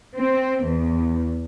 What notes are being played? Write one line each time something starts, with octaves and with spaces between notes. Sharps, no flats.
C4
E2